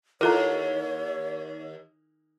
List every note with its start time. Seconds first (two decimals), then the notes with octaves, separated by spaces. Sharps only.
0.21 D#2 E4 F4 A4 A#4 C#5 A#5